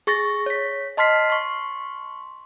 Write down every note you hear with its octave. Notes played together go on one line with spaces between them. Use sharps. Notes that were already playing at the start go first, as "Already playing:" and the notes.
G#4 C#6 A6 A#6
C#5 B6
D#5 A5 C6 F6 B6 C7
C6 C#6